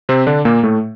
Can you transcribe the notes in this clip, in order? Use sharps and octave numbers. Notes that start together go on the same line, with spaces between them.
C3 C4
D3 D4
A#2 A#3
A2 A3